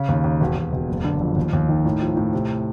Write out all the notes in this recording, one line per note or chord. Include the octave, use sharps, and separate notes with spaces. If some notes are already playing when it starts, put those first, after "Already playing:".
Already playing: C#3
D#2
D#2
E1
E1
E1
F#1
D3
F2
D#2
D#2
D#3
A2
F3
A2
C3